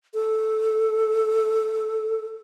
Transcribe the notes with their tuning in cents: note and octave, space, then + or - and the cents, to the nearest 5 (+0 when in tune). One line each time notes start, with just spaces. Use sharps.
A4 -5